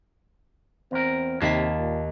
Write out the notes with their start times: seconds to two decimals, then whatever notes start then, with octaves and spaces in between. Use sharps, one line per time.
0.92 E2 C4 A#4
1.41 D#2 C3 A#3 F5 A5 A6 B6
1.79 A#2